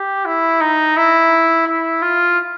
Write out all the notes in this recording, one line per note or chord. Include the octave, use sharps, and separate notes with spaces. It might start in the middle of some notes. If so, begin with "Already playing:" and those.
Already playing: G4
E4
D#4
E4
E4
F4